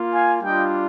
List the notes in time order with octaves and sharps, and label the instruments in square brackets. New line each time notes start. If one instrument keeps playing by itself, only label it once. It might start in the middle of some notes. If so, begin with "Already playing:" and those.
Already playing: [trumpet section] A#3 F4
F5 G#5
G3 D4 F4 D#5 G5